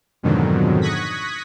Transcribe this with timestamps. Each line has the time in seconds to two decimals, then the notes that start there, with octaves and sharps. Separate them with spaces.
0.23 F2 G#2 B2 D3 D#3 F#3
0.81 C#6 D#6 F#6 G#6 A#6 B6